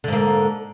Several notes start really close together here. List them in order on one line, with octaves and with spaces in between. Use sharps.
D3 G#2 A#3